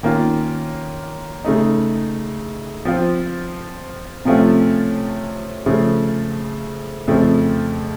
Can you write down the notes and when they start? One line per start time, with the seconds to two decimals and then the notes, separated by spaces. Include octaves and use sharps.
0.03 D#3 A#3 C#4 F4
1.44 C#3 A3 D#4
2.85 F3 C4 F4
4.25 C3 F3 A3 C#4 F4
5.66 C#3 F3 A3
7.07 F2 C#3 F3 A3